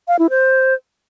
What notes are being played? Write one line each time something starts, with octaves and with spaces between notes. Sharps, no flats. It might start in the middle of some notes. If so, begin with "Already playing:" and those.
F5
E4
C5